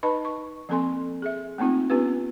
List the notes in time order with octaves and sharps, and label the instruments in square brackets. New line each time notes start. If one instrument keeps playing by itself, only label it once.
[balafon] D#4 B4 D#5 A5 B5
C#6
F3 A#3 C4 A4 G#5 C6
G#4 E5
A3 A#3 C4 D#4 F4
B3 C#4 F4 G4 B4